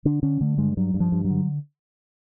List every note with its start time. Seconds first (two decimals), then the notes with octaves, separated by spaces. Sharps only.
0.05 D3 D4
0.23 D3 C#4
0.41 D3 A3
0.58 G2 G#3
0.77 G2 F#3
0.94 G2
1.00 F3
1.12 G2
1.25 F#3
1.30 D3